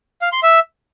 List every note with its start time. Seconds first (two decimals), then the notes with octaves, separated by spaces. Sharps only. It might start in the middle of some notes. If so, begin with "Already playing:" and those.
0.22 F5
0.32 C6
0.43 E5